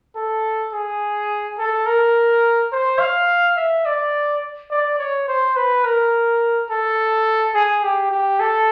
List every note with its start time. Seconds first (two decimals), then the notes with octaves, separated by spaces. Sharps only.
0.16 A4
0.72 G#4
1.58 A4
1.86 A#4
2.72 C5
3.00 F5
3.57 E5
3.86 D5
4.71 D5
4.99 C#5
5.28 C5
5.56 B4
5.84 A#4
6.70 A4
7.54 G#4
7.83 G4
8.11 G4
8.40 A4